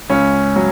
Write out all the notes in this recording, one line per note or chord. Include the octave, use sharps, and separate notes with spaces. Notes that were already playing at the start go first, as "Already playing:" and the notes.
C#2 C#4
F#3